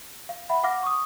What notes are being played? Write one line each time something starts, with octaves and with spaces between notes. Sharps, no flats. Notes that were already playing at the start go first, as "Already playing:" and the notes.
F5
E5 F#5 B5
F5 F#5 D6 F6 A#6
C#6 D#6